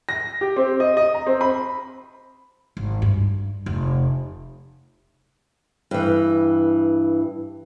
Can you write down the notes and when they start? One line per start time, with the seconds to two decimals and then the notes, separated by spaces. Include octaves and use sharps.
0.09 A#6
0.41 G4
0.56 C4
0.80 D#5
0.97 D#5
1.14 A#5
1.27 C4
1.41 B5
2.77 G#1
3.02 G2
3.66 F1
5.91 G2 E3